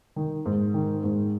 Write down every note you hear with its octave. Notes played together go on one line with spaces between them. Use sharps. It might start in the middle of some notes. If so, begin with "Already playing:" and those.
D#3
G#2
D#3
G#2